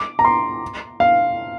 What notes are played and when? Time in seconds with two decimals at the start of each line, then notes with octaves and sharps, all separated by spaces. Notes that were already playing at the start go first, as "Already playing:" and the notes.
Already playing: D6
0.19 A#5
0.25 C6
1.00 F5